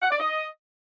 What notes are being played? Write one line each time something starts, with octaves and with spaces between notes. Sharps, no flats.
F#5
D5
D#5